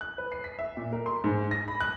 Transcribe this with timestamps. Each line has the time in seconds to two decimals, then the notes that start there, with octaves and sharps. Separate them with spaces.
0.01 F#6
0.18 B4
0.32 C7
0.44 B6
0.59 E5
0.77 A#2
0.93 A#4
1.06 C6
1.24 G#2
1.51 A#6
1.68 B5
1.81 F#6